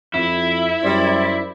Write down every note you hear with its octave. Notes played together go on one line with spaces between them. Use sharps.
F2 E4
F#2 G3 C5 D5